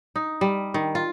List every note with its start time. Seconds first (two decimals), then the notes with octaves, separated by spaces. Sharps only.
0.16 D#4
0.41 G3
0.74 D#3
0.95 F4